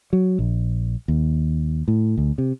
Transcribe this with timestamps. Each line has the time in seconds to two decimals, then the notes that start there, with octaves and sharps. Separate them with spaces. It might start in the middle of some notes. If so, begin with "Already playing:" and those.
0.13 F#3
0.39 A#1
1.08 D#2
1.88 A2
2.17 D2
2.38 C3